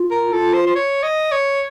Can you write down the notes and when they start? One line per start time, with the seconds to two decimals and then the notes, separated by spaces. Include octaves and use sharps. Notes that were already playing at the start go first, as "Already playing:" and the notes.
Already playing: F4
0.11 A#4
0.32 F4 A4
0.53 C5
0.67 C5
0.75 C#5
1.03 D#5
1.32 C#5